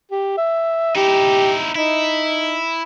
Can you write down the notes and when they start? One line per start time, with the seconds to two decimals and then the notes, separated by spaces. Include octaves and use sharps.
0.11 G4
0.37 E5
0.95 D#4 E4 G4
1.75 D#4 E4